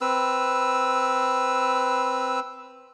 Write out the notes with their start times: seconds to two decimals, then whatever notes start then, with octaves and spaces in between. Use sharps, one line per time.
0.01 C4 B4 E6